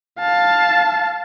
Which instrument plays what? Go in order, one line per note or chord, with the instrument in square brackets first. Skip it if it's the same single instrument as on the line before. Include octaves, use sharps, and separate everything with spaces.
[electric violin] F5 A5